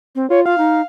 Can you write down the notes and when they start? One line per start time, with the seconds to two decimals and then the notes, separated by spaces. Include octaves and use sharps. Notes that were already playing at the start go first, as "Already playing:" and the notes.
0.15 C4
0.30 F4 C#5
0.46 F4 F5
0.58 D#4